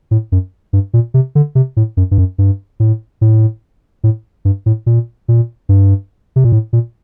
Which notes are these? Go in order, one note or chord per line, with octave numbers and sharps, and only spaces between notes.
A2
F#2
G2
A#2
C3
D3
C3
A2
F#2
G2
F#2
G2
A2
A2
A2
G2
A2
A#2
A#2
G2
C3
A#2
A2
A#2